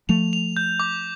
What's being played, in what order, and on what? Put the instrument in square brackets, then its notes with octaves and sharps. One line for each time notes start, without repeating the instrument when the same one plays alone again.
[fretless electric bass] F3 A3 [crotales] F7
[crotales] F7
G6
D6